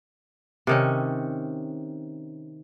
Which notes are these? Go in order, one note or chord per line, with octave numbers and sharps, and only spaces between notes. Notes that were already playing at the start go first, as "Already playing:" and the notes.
C3 D#3 C#4